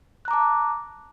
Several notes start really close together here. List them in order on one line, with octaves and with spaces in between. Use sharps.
F#6 A#5 D6 A5